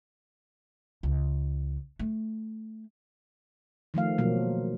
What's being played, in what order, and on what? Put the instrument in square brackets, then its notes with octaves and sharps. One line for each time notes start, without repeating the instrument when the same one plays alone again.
[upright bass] C#2
A3
[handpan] D#3 F3 A3 F5
B2 F3 F#3 A#3